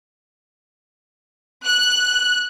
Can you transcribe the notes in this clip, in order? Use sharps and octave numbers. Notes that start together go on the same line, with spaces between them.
F#6